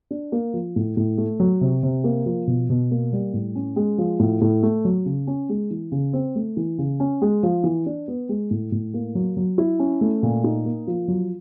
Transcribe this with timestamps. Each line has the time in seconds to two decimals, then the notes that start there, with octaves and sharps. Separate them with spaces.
0.11 D4
0.32 A#3
0.54 F3
0.76 A2
0.97 A2
1.18 A3
1.40 F#3
1.61 C3
1.83 C3
2.04 A#3
2.26 F3
2.47 B2
2.70 B2
2.91 A#3
3.13 G3
3.34 A2
3.55 C#4
3.76 G#3
3.98 F3
4.19 A2
4.41 A2
4.63 A3
4.85 F#3
5.06 C#3
5.27 C#4
5.49 G#3
5.71 E3
5.92 C#3
6.13 C4
6.35 A3
6.57 E3
6.78 C#3
7.00 C#4
7.22 G#3
7.43 F3
7.64 E3
7.86 D4
8.08 B3
8.29 G#3
8.51 A2
8.72 A2
8.94 A#3
9.15 F#3
9.37 F#3
9.58 E4
9.79 C#4
10.01 A3
10.23 A#2
10.44 D#4
10.65 A#3
10.87 F3
11.08 F#3